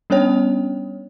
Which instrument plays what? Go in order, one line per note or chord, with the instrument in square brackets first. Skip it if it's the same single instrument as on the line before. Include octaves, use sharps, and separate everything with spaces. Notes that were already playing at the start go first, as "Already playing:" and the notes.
[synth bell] G3 B3 C#4 D4 C#5 G5